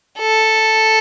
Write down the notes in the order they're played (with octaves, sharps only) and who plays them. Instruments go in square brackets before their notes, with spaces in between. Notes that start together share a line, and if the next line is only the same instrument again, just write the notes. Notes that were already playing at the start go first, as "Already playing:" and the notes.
[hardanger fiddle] A4